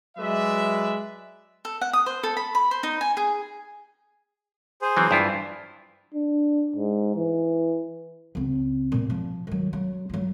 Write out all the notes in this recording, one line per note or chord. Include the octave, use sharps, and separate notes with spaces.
F#3 G#3 B4 D5 E5
A4
F#5
D#6
C5
A4
B5
B5
C5
D#4
G#5
G#4
G#4 C5
E3 F#3 C4
G2 E4 F4
D4
G#2
E3
C#2 C4
D2 A#2
F3
D#3 F#3
F#3
F#3 F4